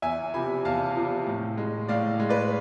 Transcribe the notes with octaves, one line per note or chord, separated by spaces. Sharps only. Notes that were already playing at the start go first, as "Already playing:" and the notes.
E2 E5 G#5
C3 F3 G#5 B5
E2 F5 A5
C3 F3
A2
G#3
A2 D5 F5
G#3
B4 D5